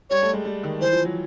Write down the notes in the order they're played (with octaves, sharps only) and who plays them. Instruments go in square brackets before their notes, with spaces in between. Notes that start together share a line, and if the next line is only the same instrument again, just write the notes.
[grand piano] G3 [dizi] C#5
[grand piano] A3
G#3
G3
D#3
[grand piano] E3 [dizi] C5
[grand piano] F3
F#3